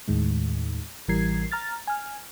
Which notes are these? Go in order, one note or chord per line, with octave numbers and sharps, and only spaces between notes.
D#2 A2 D#3 G#3
A1 E3 G3 A#4 G#6 C7
A#5 F6 A6
G#5 F6